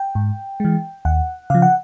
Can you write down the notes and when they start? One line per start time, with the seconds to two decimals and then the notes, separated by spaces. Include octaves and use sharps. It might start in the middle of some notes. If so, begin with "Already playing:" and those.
Already playing: G5
0.15 G#2
0.60 E3 G#3
1.05 D#2 F#5
1.50 C#3 F3 F5
1.62 F#5